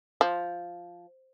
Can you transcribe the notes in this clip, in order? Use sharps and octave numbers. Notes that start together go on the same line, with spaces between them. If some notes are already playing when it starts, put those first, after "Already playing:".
F3